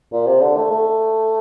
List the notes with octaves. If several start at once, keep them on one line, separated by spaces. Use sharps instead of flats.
A#2
C3
D3
A3
A3